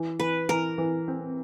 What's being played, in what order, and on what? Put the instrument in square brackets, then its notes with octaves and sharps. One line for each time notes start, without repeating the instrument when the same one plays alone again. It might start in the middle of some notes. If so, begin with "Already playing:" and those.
Already playing: [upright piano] E3
[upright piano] E3 [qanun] B4
[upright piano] E3 [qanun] A#4
[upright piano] E3
C4